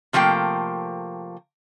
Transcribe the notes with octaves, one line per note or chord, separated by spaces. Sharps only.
C3 F3 A3 A#3 G5